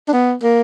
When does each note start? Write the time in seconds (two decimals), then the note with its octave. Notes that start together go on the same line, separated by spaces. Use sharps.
0.08 D4
0.13 B3
0.43 A#3